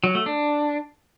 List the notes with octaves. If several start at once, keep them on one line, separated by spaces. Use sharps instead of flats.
F#3
A3
D4